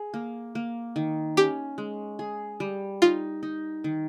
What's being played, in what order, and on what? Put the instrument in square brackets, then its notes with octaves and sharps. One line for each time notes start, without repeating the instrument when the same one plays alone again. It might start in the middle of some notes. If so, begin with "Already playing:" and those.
Already playing: [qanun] G#4
A#3
A#3
D#3
[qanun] C#4 [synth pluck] G4
[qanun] G#3
G#4
G3
[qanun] D#4 [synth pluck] F4
[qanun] D#4
D#3